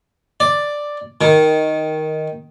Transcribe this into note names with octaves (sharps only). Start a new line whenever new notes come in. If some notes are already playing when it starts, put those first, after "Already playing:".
D5
D#3